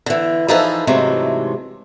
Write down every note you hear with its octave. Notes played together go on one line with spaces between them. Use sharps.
D3 E3
E3 F3 D#4 G#4 A4 B4
G#2 C3 E3 F#3 G#3 A3